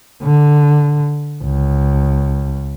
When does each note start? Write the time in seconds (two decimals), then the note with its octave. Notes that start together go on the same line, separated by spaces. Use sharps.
0.23 D3
1.43 C#2